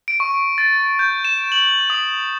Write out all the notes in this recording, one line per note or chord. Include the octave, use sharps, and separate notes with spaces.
D7
C#6
A6
G6
E7
F#7
D#6